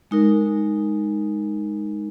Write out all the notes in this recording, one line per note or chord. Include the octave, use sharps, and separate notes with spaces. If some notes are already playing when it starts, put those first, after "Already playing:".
G#3 D#4 A#4